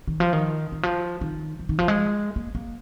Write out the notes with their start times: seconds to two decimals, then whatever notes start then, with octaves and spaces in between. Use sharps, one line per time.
0.07 D#3
0.20 F3
0.33 D#3
0.72 D#3
0.83 F3
1.21 D#3
1.59 F3
1.69 D#3
1.79 F3
1.88 G#3
2.36 A#3
2.55 A#3